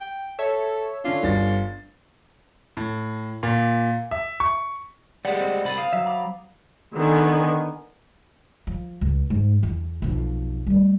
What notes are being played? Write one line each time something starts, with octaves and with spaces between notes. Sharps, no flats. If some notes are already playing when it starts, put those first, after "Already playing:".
G5
A4 C#5 E5
D3 C#4 D4 F4
G1 A6
A2
A#2
E5
C#6
G3 G#3 B4 D5 F#5
C4
C2 B5 A6 D#7
F5 D#6
F#3 E5
A#5 B5 D6
D3 D#3 B3 G#5
F3
C#2
G#2
E2
B1 F2
G3 A3